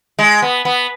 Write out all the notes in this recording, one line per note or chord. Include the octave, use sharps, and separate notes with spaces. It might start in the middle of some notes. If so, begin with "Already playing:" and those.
G#3
B3
B3